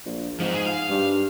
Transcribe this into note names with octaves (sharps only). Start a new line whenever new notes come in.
A#1
G#2 F3 C4
G#4
F5
G2